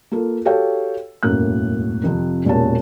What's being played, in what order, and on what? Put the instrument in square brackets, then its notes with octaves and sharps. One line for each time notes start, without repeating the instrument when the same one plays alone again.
[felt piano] A#3 F4 A4
F#4 G4 A4 C#5 F5 G5
E1 F#2 A2 A3 A#3 F#6
F2 C3 F3
E1 A#2 C#4 G4 C#5 A5